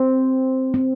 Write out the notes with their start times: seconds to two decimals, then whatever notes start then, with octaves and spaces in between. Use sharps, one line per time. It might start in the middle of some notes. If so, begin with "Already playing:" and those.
Already playing: C4
0.74 C4